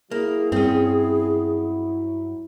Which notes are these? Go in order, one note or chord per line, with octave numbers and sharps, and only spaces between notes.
F#3 A#3 E4 G#4
G2 C4 C#4